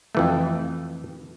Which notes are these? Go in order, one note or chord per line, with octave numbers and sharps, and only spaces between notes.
F2 E3 A3